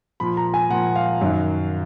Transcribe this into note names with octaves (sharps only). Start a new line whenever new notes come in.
A#2 F3 B5
A#5
G#5
A#2 F3 F#5
F5
F#2 D#3 F#3